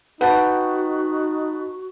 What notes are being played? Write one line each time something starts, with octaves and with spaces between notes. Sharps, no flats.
D#4 F#4 B4 F#5 G5 A5